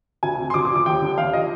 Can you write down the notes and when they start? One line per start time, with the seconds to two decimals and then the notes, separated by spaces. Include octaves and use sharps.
0.23 D2 G#5
0.38 C3
0.50 C6
0.54 D2 D6
0.65 D6
0.70 F3
0.76 D6
0.86 D#2 G5
1.02 D3
1.18 D#2 F5
1.33 F3 D#5